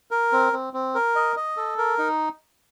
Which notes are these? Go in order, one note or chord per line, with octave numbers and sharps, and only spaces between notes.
A#4
C4
C4
C4
A#4
D#5
D#5
A4
A#4
D#4